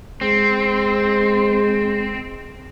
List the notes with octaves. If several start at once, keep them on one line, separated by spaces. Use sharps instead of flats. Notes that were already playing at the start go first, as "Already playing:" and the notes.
G#3 C4